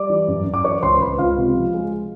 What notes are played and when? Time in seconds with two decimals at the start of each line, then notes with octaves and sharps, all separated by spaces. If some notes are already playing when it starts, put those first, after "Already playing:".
Already playing: G3 D5 D6
0.10 E3
0.28 F#2
0.46 F#2
0.54 D6
0.64 E3 C#5 C#6
0.82 C#2 C5 C6
1.01 C#2 B4 B5
1.18 C#2 F4 F5
1.38 C3
1.55 F3
1.74 G#3